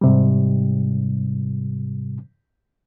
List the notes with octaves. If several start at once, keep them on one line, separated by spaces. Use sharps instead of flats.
G#2 C3 G3